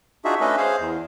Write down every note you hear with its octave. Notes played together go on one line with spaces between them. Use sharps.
D4 D#4 F4 F#4 G#4 E5
A3 C#4 D4 A4 B4 D#5
G#4 C5 F5
E2